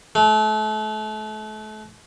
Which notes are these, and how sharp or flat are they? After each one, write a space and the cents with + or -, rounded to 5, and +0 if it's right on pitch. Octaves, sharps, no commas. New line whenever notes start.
A3 -35